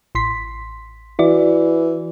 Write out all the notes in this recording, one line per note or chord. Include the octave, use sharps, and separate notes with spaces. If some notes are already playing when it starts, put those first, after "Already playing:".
A1 C6 B6
E3 E4 F#4 D5